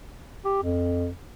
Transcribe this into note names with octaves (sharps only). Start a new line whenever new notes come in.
G4
F2